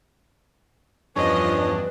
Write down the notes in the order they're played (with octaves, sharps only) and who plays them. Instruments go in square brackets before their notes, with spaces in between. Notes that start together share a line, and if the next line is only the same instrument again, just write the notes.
[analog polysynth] E2 G2 D4 [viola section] F3 D#5 [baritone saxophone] C#4 [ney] B4